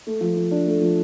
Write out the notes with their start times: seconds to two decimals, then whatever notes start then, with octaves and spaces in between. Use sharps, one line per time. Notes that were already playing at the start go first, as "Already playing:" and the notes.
0.07 A3
0.21 F3
0.37 F3
0.51 D4
0.67 A3
0.81 F3